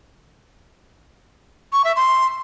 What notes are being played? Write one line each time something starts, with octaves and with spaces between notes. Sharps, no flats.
C#6
E5
C6